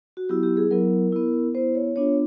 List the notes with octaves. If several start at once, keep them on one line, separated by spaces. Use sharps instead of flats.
F#4
F#3 B3 E4 G4
G4
G#4
F#3 B3 E4 A#4
B3 E4
B3 E4 C5
C#5
B3 D4 F4 C#5